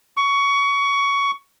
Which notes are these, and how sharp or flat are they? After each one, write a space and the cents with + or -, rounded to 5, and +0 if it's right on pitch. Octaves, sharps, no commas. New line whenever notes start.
C#6 +20